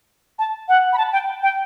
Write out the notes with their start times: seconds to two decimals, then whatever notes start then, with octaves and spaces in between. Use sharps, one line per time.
0.39 A5
0.69 F#5
0.93 B5
0.98 A5
1.12 G5
1.43 G5